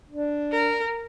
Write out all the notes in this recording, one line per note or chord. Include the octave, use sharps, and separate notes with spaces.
D4
A#4